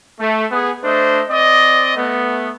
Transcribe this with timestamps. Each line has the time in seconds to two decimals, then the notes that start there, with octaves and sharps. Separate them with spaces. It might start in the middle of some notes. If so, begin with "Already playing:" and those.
0.20 A3
0.51 B3 G#4
0.83 A3 D4 C5 D#5
1.30 C4 D5 D#5
1.96 A3 B3